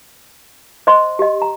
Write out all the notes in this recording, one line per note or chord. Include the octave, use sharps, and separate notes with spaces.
C5 D#5 C6
G4 D#5
A#5